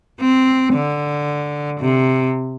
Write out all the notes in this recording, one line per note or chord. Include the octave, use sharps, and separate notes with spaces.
C4
D3
C3